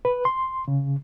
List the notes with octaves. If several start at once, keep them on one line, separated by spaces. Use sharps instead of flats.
B4
C6
C#3